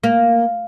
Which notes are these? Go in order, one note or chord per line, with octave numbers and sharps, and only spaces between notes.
A#3